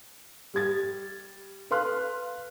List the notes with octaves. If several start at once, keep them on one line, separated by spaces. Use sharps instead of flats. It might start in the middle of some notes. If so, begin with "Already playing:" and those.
G3 G4 G#6 A6
A4 B4 F5 C6 F6 F#6